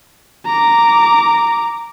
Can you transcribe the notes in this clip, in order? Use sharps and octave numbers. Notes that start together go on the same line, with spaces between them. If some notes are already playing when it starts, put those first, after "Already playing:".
A#5 D6